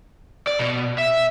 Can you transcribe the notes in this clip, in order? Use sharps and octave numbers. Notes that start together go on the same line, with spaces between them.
D5
B2
E5